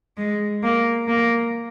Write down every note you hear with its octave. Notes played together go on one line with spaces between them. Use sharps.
G#3
A#3
A#3